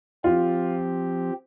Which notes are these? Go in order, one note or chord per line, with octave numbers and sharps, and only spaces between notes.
F3 C4 F4 G4